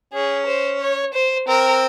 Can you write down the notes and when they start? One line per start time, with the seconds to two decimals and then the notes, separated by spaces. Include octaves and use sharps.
0.13 C#4 G#4
0.47 C5
0.81 C#5
1.14 C5
1.47 C4 A#4